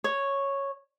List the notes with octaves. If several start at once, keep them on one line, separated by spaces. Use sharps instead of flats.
C#5